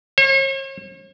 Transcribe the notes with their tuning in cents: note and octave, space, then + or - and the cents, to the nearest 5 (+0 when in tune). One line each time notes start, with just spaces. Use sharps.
C#5 -45